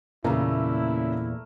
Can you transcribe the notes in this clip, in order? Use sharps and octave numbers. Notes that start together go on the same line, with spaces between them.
E2 A#2 C#3 A3 A#3 E4 A#4